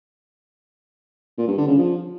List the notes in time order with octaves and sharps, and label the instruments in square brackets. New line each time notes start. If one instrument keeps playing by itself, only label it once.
[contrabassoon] A#2
G2
D3
C#3
F3